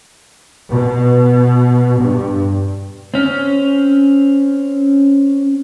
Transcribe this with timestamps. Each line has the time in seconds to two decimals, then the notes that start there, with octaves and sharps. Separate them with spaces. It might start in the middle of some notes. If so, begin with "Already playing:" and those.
0.71 B2
2.00 G2
3.14 C4 C#4